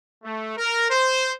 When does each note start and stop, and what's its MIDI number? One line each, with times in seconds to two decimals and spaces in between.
0.24 0.54 57
0.58 0.89 70
0.91 1.30 72